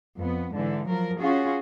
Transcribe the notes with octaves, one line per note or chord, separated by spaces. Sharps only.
F2 B3
G#2 D3 E3
F3 F#3 A#4
C#4 F4 F#4 G#4